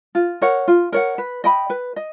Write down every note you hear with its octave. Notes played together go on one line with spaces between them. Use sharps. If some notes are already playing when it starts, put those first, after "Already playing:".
F4
A#4 C#5 F#5
F4
A#4 C#5 F#5
B4
D#5 G5 B5
B4
D#5